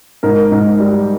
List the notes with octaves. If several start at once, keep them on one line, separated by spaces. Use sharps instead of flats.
G#2 A#4
G#2
G3